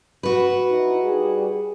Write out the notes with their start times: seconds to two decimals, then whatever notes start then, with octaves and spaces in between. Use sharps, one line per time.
0.23 F#4 B4
0.71 D#4 E4
1.03 G3 G#4